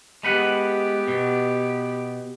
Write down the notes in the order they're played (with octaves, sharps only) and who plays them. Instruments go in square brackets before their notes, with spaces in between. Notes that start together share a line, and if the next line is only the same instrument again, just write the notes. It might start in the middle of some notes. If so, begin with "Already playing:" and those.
[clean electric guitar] G#3 B4 F#5 [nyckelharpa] B3 G4
[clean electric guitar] B2